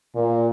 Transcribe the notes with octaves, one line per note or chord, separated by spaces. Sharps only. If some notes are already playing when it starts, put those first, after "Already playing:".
A#2